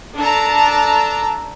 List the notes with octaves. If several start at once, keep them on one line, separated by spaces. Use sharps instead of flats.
D4 A4 A5 A#5